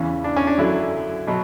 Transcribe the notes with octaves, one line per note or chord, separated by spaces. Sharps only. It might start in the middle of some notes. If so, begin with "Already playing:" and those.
Already playing: E2 C#3 E3
D4
C#4
D4
F#2 D3 F#3 E4
B2 F#3